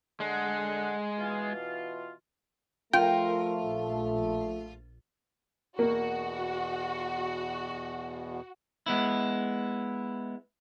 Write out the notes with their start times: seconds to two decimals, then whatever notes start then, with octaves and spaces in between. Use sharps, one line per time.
0.20 D3 G#3 F#5
1.18 B2 E3 F4
2.93 F3 A3 F4 A#4 G5
3.63 A#1
5.79 E2 B2 A#3 F#4
8.86 G#3 B3 E4